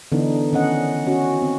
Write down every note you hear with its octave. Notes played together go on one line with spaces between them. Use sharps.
D3 E3 B3 D4 D#4
D#3 C#4 D#5 F#5
C#4 F#4
C4